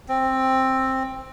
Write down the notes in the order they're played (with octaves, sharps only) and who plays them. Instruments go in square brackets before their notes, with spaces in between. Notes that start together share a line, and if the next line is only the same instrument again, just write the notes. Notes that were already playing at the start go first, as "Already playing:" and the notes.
[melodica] C4